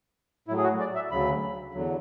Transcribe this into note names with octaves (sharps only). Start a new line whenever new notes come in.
A2 F#3 E4
G#4
F#4
D5
E5
D2 C#3 F#3 B5
E2 D3 F#3